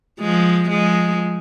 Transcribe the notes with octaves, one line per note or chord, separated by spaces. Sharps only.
F3 G#3
F3 G#3